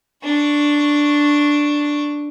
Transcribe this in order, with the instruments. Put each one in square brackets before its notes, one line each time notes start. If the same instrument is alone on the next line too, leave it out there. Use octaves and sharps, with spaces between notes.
[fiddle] D4 C#6